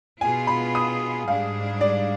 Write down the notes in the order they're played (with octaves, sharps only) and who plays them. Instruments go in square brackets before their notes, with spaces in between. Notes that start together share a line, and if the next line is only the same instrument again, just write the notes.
[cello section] B2 B3 F4 G#4 [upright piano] G#5
[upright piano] B5
D#6
[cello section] G#2 G3 D4 G#4 [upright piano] F5
[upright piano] D5